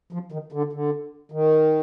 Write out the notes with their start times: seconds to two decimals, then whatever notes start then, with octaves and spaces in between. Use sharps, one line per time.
0.13 F3
0.32 D#3
0.52 D3
0.73 D3
1.32 D#3